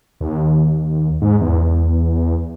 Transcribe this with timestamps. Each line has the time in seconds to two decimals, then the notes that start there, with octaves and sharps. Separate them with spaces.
0.21 D#2
1.21 G#2
1.41 E2